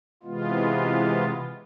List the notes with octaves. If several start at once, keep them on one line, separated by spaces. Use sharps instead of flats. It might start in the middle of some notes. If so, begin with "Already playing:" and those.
C3 E3 G#3 B3 F4